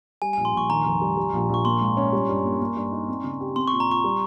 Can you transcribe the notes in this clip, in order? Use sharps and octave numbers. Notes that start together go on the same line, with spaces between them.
G3 G#5
G#5
A#1
C6
A#1 C#6
D#3 A#5
F1
G3
G3
A#1
A#1 C#6
A#3 C6
G#2
C#4
G3
G2
A#3
A#3
G2
D#4
C4
C#3
G4
C4 C6
C#6
A#2
A#5
F4 C#6
G3